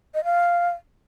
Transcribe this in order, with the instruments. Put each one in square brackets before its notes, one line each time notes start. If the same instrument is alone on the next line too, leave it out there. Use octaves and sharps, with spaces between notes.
[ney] D#5
F5